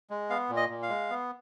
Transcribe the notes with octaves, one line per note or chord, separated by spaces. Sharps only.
G#3
B3 F5
A#2
D#5
A#2
F5
G#3
B3